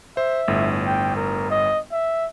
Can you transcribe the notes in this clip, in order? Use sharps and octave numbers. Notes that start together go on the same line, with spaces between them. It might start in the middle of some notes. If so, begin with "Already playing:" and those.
C5 E5
G1 A2
G5
A#4
D#5
E5